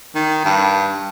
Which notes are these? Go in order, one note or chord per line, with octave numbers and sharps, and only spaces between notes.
D#3
G2